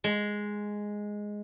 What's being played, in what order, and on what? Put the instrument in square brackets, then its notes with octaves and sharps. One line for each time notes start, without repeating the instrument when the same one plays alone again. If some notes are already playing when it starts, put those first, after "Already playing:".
[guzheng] G#3